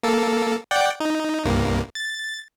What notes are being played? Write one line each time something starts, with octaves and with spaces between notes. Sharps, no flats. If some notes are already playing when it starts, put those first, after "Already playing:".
A#3 A4
D5 F#5 G5
D#4
C2 G2 A#3
A6